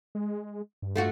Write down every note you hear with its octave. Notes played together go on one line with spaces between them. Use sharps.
G#3
G2
A3 F4 F#4